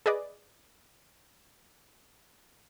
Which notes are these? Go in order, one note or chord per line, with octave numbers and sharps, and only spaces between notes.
G#4 B4 D5 D#5